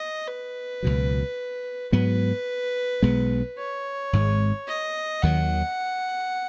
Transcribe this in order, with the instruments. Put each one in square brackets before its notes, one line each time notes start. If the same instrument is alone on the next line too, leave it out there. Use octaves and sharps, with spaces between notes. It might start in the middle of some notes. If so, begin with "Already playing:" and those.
Already playing: [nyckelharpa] D#5
B4
[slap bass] C#2 B2 F#3
[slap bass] G#2 F#3 B3 [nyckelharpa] B4
[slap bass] B1 B2 G#3 B3
[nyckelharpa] C#5
[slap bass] G#1 G#2 G#3
[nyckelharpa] D#5
[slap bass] D#2 D#3 F#3 [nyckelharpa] F#5